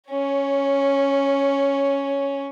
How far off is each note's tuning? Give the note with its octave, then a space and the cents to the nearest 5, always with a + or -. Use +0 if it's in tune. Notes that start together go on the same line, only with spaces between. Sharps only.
C#4 +0 C#5 +15